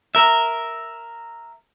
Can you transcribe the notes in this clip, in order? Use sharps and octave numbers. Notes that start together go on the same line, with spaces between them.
A#4 E5